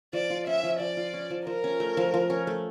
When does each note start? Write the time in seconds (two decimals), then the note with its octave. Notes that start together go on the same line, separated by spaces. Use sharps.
0.13 F3 D5
0.30 F4
0.47 C#4 E5
0.64 F3
0.80 F3 D5
0.97 F4
1.14 C#4
1.30 F3
1.47 F3 A#4
1.64 C#4
1.80 A3
1.97 F3
2.14 F3
2.30 C#4
2.47 A3